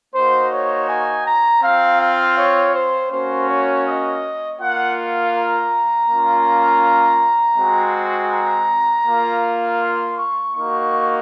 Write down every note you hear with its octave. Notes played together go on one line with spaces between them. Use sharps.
A#3 D#4 F#4 C5
C#5
G#5
A#5
C4 F4 F5
F5
C#5
C5
A#3 C#4 F#4 C5
C#5
D#5
A#3 F4 F#5
A#5
A#3 C#4 F4
G#3 C4 F#4
A#5
A#3 F4
C6
C#6
A#3 D#4 F#4 C#6